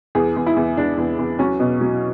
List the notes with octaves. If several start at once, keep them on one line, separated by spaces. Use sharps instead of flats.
E2 G#4
E2
E4
E2
E2 D4
E2
E2
F#3 C#4
B2
F#3